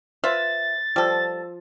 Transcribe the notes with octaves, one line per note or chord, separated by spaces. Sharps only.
F4 B4 C5 E5 A6
F3 G3 A4